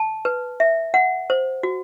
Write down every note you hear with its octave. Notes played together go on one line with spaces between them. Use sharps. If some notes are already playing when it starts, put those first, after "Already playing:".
Already playing: A5
B4
E5
F#5
C5
F#4